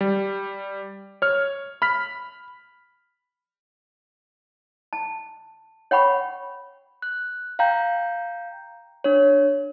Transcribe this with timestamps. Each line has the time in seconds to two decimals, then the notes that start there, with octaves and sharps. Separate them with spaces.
0.01 G3
1.22 C#5 F6
1.82 B5 F6 B6
4.93 A5
5.91 C#5 F#5 G5 B5 C#6
7.02 F#6
7.59 F5 G5 A#5 G6
9.04 D4 C#5